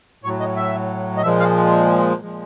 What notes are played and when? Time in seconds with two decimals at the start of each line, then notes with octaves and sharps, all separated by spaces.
0.24 A2 F#3 C#5
0.40 D#5
0.56 E5
1.17 D#5
1.22 A#2 F3 G#3 E5
1.39 F5
2.21 A#2 F3 G#3